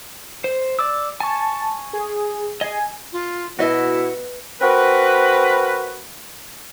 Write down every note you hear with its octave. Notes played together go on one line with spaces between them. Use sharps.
C5
D5 D6 E6
G#5 A5 C#6
G#4
G#4 D#5 G#5
F4
B2 E4 F#4 B4 D#5
C4 F#4 A#4 B4